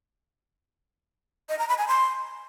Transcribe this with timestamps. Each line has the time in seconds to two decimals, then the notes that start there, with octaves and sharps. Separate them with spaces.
1.49 D#5
1.59 A#5
1.68 B5
1.78 G#5
1.88 C6